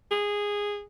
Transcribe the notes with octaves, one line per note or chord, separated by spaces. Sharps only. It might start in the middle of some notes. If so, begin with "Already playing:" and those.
G#4